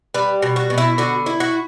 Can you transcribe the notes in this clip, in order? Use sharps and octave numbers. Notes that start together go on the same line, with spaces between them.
G3 B4
B2
F#4
B2
E4
D3 F#4
E4
F#4